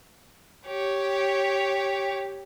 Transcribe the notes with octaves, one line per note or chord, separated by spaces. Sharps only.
G4 C#5